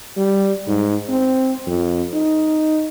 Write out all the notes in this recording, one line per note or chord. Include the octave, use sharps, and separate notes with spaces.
G3
G#2
C4
F2
D#4